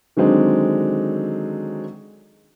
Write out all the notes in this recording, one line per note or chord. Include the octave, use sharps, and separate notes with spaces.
D3 D#3 F#3 G#3 C4 D4